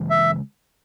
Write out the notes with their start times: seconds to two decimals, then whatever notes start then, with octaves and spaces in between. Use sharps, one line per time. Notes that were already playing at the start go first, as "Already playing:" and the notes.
Already playing: C#3 E3 G#3
0.10 E5